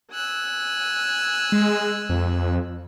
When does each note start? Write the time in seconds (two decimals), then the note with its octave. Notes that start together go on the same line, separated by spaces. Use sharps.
0.12 G#5 E6 F#6
1.52 G#3
2.09 F2